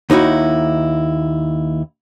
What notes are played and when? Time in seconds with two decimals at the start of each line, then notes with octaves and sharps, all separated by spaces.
0.10 D#2 D#4 E4 F#4